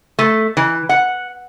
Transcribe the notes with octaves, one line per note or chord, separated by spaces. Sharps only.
A3
E3
F#5